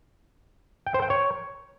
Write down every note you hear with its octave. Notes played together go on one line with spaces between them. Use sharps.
G5
C5
G5
C#5